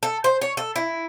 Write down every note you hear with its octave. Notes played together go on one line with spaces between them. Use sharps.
A4
C5
C#5
A4
E4